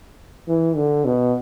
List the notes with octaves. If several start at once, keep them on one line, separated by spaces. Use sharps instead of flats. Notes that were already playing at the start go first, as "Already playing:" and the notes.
E3
D3
B2